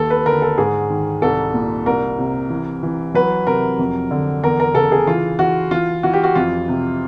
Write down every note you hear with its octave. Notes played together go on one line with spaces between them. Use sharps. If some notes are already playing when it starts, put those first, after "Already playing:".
Already playing: D#2 A4
B4
D3 A#4
A4
G#2 G#4
D#3
C2 A4
A#2
C2 A#4
C3
E3
E3
F#3 B4
C3 A#4
F2
D3
E2 A#4
A#4
C#3 A4
G#4
E3 F4
E3 F#4
E3 F4
E3 F#4
G4
F#4
F2 F4
C3